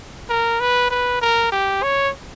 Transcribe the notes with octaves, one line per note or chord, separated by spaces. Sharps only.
A#4
B4
B4
A#4
G4
C#5